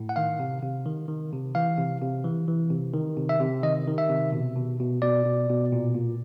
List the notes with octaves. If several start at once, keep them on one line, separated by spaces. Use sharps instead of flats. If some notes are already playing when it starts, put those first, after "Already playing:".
Already playing: A2
F#5
D#3 F5
C3
C3
D#3
D#3
C3
E3 F5
C3
C3
E3
E3
C3
D#3
C3
E5
C3
D#3 D#5
D#3
E5
C3
B2
B2
B2
B2 D5
B2
B2
A#2
A#2